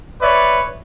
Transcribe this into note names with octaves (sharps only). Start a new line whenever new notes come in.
B4 C#5 D5 E5